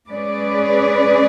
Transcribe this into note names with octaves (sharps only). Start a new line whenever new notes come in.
G#3 C#4 G#4 B4 D5